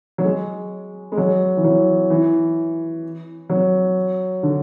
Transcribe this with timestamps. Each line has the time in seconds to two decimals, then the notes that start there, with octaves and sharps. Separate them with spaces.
0.18 F#3
0.25 G#3
1.12 G#3
1.17 F#3
1.57 E3
1.64 F#3
2.10 E3
3.50 F#3
4.43 D3